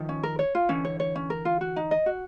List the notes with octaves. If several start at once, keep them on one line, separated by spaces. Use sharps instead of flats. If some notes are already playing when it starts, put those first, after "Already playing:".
Already playing: D#3 F3
C#4
A#4
C#5
F4
D3 E3 C#4
C#5
C#5
C#4
A#4
F4
F#4
D#4
D#5
F#4